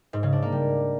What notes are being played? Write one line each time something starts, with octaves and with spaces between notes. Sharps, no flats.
G#2
C#3
D4
A#3
G3